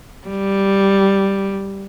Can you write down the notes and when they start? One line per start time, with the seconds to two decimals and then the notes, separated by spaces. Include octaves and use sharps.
0.27 G3